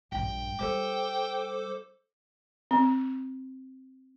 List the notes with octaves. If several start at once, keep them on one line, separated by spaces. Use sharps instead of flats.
A#1 G2 G5
G3 A4 C5 D6
C4